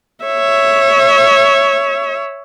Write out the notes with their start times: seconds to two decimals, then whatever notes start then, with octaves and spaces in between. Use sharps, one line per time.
0.24 C#5 E5